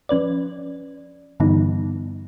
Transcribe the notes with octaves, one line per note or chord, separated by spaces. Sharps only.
F3 C#4 B4 D5
G2 D3 E3 G3 B3 D#4